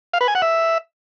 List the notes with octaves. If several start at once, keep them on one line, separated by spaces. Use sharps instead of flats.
F5
B4
G#5
F#5
E5